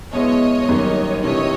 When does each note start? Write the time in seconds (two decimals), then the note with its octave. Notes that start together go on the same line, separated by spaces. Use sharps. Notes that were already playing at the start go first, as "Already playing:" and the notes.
0.12 B1 B2 G#3 B3 E4 C#5 D#5
0.68 F#1 F#2 D#3 G3 A#3
1.23 C3 E3 A3 D4 G4 C#5 D#5